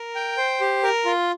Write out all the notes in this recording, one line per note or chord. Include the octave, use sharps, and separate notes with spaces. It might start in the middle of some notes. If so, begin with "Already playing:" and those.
Already playing: A#4
G5
C5
G4
A#4
F4